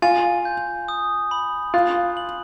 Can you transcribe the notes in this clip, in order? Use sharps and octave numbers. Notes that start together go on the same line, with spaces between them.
F4 G#5
G6
D#6
B5
F4 F#6
F#7